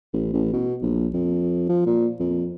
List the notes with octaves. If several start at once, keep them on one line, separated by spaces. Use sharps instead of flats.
A1
A1
B2
A#1
F2
F3
A#2
F2